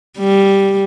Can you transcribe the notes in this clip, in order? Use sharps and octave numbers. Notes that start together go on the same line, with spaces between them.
G3